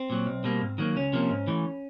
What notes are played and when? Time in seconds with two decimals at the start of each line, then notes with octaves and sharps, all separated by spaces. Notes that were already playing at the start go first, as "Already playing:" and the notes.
Already playing: C4
0.10 A#2 F#3
0.26 B1
0.44 B2 G3 A#3
0.61 G#2
0.78 D#3 F#3 A#3
0.96 C#2 C#4
1.13 C3 F3 A#3
1.31 G#2
1.47 E3 A3